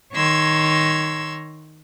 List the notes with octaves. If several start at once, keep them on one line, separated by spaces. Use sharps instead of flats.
D#3 C#5 A#5 C6 E6 G#6